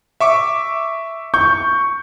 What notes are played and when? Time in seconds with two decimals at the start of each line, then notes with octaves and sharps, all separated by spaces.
0.20 E5 C#6 D6
1.34 C#6 G6